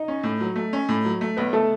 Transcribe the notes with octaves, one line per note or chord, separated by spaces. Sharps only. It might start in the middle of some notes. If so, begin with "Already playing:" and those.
Already playing: D#4 D#5
C#4
A2
F#3
A3
C#4
A2
F#3
A3
B1 B3 B4
A3 A4